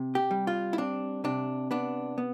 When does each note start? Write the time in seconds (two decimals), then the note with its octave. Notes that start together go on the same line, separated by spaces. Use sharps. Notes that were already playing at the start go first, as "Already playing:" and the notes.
Already playing: C3
0.15 G4
0.31 G3
0.47 F4
0.73 E4
0.78 C4 D4
1.24 C3 D4
1.71 B3 D4
2.18 B3